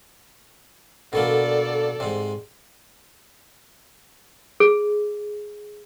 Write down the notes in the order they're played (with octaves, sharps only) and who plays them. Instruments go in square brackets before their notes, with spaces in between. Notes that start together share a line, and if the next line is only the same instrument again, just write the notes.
[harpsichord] B2 D3 A#3 [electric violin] A4 D5
[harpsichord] G#2 C3
[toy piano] G#4